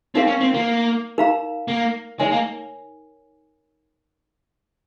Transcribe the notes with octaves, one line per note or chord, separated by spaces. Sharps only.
C4 D#4 A#4 F5
C#4
C4
A#3
D#4 A#4 F5 A#5
A#3
G#3 D#4 A#4 C#5 G#5
A#3